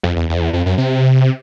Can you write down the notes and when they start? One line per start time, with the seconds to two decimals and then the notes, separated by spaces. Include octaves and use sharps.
0.03 F2
0.16 E2
0.29 E2
0.36 F2
0.41 E2
0.53 F2
0.66 F#2
0.78 C3